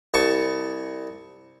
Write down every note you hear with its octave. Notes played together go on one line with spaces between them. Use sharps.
C2 A5 C#6